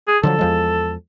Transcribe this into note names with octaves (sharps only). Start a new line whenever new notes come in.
G#4
D3 F3 F#3 A4
E2 F3 G#3